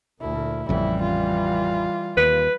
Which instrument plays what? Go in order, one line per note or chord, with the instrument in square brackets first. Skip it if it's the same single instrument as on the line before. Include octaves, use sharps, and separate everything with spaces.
[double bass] D2 A#2 [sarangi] E4
[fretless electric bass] A1 F2 C#3 [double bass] E3 G3 [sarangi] E4
[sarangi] F4
[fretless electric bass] D#2 [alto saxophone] B4